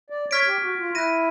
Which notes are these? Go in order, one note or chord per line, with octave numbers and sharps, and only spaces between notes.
D5
C#5 C#6 F6 G#6 B6 D7
G4
F#4
F4
E4 F#6 A#6 D#7